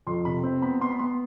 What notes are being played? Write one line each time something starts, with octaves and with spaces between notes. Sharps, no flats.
F2 C6
C3 B5
C4
B3 B5
B3 C6
B5
B3 C6